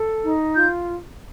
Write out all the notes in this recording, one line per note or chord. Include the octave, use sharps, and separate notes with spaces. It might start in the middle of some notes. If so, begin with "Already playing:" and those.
Already playing: A4
D#4
F4 G6